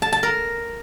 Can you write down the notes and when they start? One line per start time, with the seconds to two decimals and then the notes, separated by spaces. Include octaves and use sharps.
0.02 A5
0.12 A5
0.23 A#4